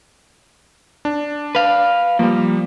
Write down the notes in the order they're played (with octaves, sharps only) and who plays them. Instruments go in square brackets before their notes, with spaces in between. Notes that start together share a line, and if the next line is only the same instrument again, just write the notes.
[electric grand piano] D4
[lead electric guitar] B4 F5
[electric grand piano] F3 G3 [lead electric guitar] A#3